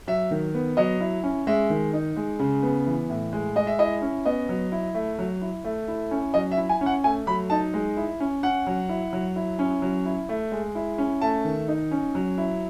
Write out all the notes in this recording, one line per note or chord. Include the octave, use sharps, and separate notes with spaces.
F#3 E5
D#3
B3
F#3 D#5
E4
C#4
G#3 E5
D#3
D#4
G#3
C#3
B3
E3
A2
G#3
G#3 D#5
E5
E4 D#5
C#4
B3 D#5
F#3
E4
A3
F#3
E4
A3
E4
C#4
F#3 D#5
E5
E4
G#5
C#4
F#5
A3 G#5
F#3 B5
D#4 A5
G#3
E4
C#4
C#4 F#5
F#3
E4
F#3
E4
C#4
F#3
E4
A3
G#3
E4
C#4
A3 A5
D#3
D#4
C#4
F#3
E4